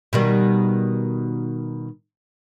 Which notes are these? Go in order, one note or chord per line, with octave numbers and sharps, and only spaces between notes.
B2 D#3 G3